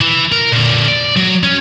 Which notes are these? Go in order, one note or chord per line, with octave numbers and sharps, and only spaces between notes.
E3
A#4
A#2 D3
D5
F#3
C#4